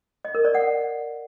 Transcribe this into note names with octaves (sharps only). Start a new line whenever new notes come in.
D#5
A#4
D5
F#5